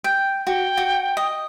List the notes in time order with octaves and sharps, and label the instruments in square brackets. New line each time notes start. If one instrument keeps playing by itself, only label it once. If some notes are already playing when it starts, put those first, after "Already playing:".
[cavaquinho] G5
[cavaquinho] F#4 [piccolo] G5
[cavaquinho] F#4
D#5